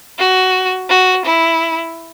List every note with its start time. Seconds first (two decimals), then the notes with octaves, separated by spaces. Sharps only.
0.18 F#4
0.89 F#4
1.25 E4